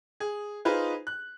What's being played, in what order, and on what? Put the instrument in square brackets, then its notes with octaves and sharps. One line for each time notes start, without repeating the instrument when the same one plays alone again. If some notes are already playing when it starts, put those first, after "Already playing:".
[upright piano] G#4
D#4 F4 G#4 B4 C5
F#6